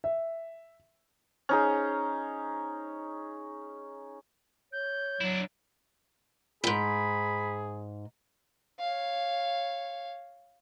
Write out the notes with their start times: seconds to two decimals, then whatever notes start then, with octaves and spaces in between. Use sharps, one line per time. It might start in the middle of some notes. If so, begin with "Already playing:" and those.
0.04 E5
1.49 C#4 D#4 G#4
4.72 C#5 G6
5.21 F#3 D4 E4
6.64 E2 G#2 G#4 B5
8.80 C#5 F5